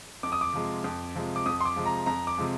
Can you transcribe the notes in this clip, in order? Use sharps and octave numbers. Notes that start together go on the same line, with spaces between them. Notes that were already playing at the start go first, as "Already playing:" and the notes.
F2 D6
D#6
D6
C3 F3 G#3
F2
C3 F3 G#3
D6
F2 D#6
C6
D6
C3 F3 G#3
A#5
F2 A#5
D6
C3 F3 G#3